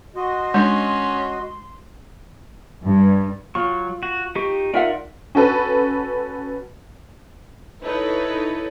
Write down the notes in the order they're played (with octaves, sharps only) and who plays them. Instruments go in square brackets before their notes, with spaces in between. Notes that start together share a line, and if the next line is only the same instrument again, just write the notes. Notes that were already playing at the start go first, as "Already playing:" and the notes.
[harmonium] F#4 D#5 [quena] C6
[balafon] G#3 D4 [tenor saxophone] C#4
[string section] G2
[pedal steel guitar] F#3 C#6 [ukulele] F4
[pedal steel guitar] F#4
D#4 G4 C#6
[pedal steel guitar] D#4 A#4 D5 [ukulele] F4 E5 F#5
[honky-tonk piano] C#4 F#4 A4 B4
[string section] D#4 E4 A4 B4 C#5